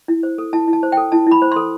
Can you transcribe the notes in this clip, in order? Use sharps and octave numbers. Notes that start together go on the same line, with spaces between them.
E4
C5
A4
E4 A5
E4
A5
C5
A4 G5
E4 A5
E4 B5
C5
A4 C6